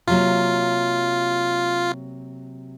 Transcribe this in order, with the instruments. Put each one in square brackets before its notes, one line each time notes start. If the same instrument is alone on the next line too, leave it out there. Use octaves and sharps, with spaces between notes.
[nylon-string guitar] C3 F#3 A#3 [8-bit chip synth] F4